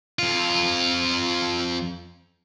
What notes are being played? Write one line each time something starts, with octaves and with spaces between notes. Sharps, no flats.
F2 F4